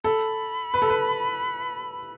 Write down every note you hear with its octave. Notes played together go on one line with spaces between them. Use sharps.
A4 B5
B4
A4
B4